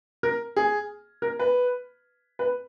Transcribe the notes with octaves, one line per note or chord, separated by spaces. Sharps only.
A#4
G#4
A#4
B4
B4